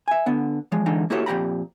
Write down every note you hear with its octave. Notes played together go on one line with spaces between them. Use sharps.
E5 G#5
D3 B3
E3 F3 G#3
D3 E3 G#3 D#4
A#3 E4 F#4 G4 A4 C#5
F2 A#2 A3 G4 A#5 B5